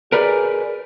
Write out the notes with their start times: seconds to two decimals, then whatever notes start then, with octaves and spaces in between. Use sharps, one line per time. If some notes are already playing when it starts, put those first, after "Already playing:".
0.12 G#4 A#4 B4 D5